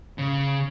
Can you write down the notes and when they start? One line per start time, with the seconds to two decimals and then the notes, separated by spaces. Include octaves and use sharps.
0.18 C#3